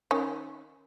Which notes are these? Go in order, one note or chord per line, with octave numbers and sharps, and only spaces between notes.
D#3 C#4